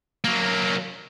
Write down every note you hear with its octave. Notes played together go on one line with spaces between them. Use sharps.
F#3 A#3